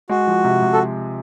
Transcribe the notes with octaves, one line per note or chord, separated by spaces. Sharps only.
G#3 F#4
F3
C3
C3
A4